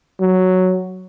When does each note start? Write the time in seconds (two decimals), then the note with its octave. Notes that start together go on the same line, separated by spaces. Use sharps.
0.21 F#3